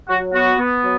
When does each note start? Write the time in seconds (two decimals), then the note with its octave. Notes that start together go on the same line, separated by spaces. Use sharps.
0.08 F#3 F#4
0.33 B3 F#4
0.59 B3
0.83 F#3